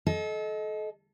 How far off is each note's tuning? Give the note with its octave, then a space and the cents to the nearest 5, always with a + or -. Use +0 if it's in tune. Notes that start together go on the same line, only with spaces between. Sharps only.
A4 -35 D#5 +10